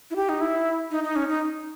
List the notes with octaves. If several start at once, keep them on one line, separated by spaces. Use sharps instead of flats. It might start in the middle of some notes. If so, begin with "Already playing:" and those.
E4
G4
D#4
E4
D#4
D#4
C#4
D#4